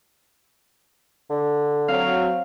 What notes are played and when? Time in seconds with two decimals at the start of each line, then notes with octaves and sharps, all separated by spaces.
1.30 D3
1.88 F#3 C4 F5